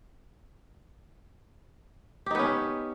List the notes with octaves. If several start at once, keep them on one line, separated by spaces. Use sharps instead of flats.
B3 C#4 D#4 G4